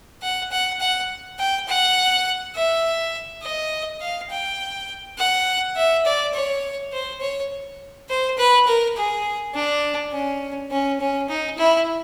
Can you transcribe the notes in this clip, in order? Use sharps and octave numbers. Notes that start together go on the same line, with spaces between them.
F#5
F#5
F#5
G5
F#5
E5
D#5
F5
G5
F#5
E5
D5
C#5
C5
C#5
C5
B4
A#4
G#4
D4
C#4
C#4
C#4
D#4
E4